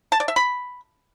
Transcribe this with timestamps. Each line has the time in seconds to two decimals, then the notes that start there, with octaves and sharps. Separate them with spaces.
0.12 A5
0.20 D5
0.28 E5
0.36 B5